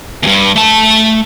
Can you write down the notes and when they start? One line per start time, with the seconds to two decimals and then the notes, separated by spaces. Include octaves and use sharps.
0.23 E2 G2
0.56 A3 A5